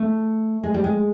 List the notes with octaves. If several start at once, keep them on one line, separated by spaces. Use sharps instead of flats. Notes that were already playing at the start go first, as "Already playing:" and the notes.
Already playing: A3
G#3
G3
G#3